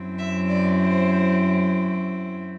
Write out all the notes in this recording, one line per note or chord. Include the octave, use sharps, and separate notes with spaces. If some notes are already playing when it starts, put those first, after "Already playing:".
Already playing: F#2 F#3 C4 E4
E5
D5
C5